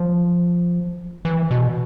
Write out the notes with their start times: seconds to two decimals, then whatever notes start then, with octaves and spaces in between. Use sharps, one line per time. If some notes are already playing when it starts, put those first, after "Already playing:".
Already playing: F3
1.25 E3
1.51 B2